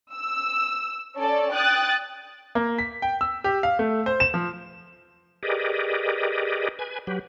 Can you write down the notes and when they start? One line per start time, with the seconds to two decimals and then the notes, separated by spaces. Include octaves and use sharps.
0.12 E6
1.15 C#4 A4 D5
1.52 G5 D#6 F#6 A6
2.55 A#3
2.79 B6
3.02 G5
3.21 E6
3.44 G4
3.63 F5
3.79 A3
4.06 C5
4.20 E7
4.34 F3
5.43 G4 G#4 A#4 B4 D5 D#5
6.79 B4 G#5
7.07 F#3 G4 B4